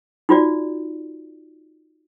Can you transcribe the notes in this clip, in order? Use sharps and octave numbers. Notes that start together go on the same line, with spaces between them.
D#4 F4 F#4 D5